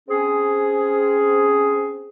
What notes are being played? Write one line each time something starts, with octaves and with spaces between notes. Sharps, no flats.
C4 C#4 G#4